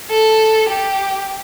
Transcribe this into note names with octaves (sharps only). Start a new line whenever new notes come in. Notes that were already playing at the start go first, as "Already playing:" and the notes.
A4
G4